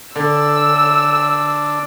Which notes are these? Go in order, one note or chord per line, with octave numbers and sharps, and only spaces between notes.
D3 D4 E6